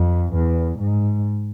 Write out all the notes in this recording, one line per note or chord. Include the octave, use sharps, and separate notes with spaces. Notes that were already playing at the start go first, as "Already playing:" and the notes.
Already playing: F2
E2
G#2